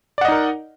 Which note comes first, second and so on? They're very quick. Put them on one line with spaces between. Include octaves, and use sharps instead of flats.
D5 F#5 D#5 D#4 A#4